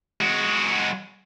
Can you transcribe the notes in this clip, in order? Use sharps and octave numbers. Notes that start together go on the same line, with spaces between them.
G#3 F#4